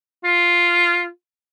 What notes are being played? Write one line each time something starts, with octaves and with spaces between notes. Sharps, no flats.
F4